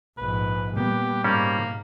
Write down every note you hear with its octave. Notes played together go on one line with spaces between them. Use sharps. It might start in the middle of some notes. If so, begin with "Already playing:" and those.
A#1 G#2 B4
A#2 G3 B3 G4
G#2 G3 A#3 C#4 C5